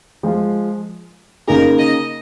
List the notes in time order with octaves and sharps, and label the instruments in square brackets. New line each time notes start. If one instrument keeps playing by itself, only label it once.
[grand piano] F3 G#3 F4
[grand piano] C#3 A#3 D#4 G#4 [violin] A#4
[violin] D#5